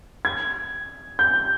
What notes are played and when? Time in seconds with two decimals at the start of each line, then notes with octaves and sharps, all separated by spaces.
0.25 G#6
1.19 G6